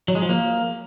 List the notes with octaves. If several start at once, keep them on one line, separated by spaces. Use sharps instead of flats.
F#3
G#3
F3
A#3